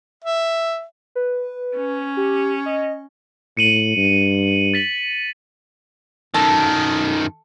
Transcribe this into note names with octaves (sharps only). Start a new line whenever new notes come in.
E5
B4
C#4
G4
D#5
A2 C#7 D#7 F#7
G2
A6 B6 F#7
F#2 D#3 A4